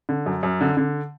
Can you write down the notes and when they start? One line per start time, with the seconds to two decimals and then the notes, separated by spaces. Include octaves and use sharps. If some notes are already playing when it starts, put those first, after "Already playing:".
0.09 D3
0.26 F#2
0.43 F#2
0.61 D3
0.77 D3